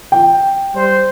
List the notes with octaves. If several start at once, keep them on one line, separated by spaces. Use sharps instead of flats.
G5
G3 C5